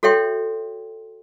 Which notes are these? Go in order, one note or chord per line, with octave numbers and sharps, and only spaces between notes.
F#4 A4 C#5 E5 G5 C6